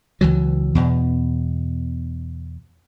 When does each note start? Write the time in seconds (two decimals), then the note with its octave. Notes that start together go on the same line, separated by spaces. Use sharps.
0.21 C#2 E3 F#3
0.75 E2 B2